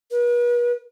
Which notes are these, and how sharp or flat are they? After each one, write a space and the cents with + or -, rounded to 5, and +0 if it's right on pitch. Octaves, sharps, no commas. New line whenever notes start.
B4 -45